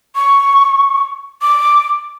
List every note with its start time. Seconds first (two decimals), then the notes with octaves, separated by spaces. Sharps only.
0.16 C#6
1.42 D6